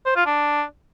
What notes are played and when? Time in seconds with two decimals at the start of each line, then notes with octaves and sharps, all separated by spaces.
0.06 C5
0.16 F4
0.26 D4